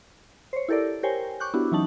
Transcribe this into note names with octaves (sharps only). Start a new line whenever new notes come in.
C5 C#5
E4 G4 A4 A#4 D5
G4 A#4 C5 C#5 G5 G#5
C#6 D6 F#6 G6
B3 D4 E4 F#4 G4
E3 F#3 C#4 D#4 A5 F#7